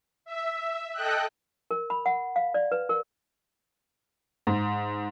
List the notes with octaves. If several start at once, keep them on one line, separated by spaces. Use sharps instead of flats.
E5
A4 D#5 G5 F#6
A#4
B5
F#5
F5
D5
B4
A#4
G#2